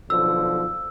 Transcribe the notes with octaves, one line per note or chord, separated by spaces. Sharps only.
B1 D3 F3 E6